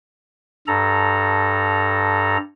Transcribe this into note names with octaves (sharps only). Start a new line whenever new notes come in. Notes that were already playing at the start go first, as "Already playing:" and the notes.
G2 A4 A#5